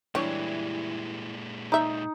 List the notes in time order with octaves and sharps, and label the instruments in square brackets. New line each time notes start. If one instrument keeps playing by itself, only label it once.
[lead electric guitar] A#2 G#3 [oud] E3 G3 [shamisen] D4 B4 C#5
[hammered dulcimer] D#4 [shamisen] D5 E5